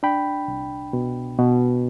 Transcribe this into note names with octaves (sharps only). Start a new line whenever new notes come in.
D4 G5 B5
C2
B2
B2